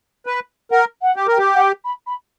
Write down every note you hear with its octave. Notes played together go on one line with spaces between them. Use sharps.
B4
A#4 F#5
F#5
G4
A#4 G5
G4
F#5
G5
B5
B5